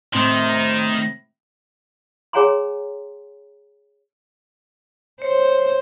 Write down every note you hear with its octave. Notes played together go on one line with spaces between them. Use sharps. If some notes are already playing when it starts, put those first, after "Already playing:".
A2 C3 D#3 C4 C6
G#4 C#5 F#5 G#5 A#5 C6
C5 C#5